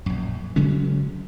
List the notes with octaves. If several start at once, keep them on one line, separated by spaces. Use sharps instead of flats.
A#1 F#2
C#3 F#3 G#3 C#4